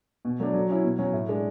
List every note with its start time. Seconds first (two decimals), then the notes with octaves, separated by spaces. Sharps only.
0.25 B2
0.40 F#3 A3 D4
0.54 F#3
0.69 C#4 E4
0.84 B2
0.99 F#3 C#4
1.13 A2
1.28 G#3 D4